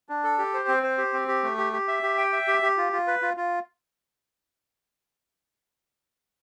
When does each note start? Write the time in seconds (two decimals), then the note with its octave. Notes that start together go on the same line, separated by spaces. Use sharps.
0.09 D4
0.24 A4
0.38 G4
0.54 C5
0.68 C4
0.83 C5
0.98 G4
1.13 C4
1.28 G4
1.43 A3
1.58 G4
1.73 G4
1.88 E5
2.03 G4
2.18 G5
2.33 E5
2.48 G4
2.62 G4
2.77 F4
2.93 F4
3.07 B4
3.22 F4
3.37 F4